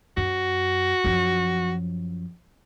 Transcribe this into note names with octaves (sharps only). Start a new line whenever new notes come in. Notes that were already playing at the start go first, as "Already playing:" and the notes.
F#2 F#4
F#2 F3